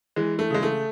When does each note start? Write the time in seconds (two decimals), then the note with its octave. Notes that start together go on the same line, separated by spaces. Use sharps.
0.16 E3 G#3
0.39 A3
0.50 C#3 G#3
0.63 A3